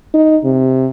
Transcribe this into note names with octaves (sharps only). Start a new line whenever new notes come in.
D#4
C3